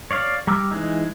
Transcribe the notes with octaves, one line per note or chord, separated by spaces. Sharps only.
C#5 D5 F5
G3 A#5 D6 E6 F6
E3 G#3 D#4